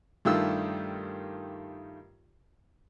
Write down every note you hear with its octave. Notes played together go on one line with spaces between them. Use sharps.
G2 D#3 A3 F4 G4 E6